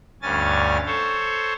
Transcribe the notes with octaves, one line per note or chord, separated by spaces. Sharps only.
D2 G2 C#4 G#5 A6
A4 C5 C#5